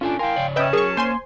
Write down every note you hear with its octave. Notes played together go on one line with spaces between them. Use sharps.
C#4 D4 F4 A4 G#5
E4 A#4 F5 G5 G#5 C6
C#3 C#5 D5
C#4 B4 D#5 E5 G5 A5 D#6
F#3 G#4 A#4 C#6
A#3 C5 G#5 C6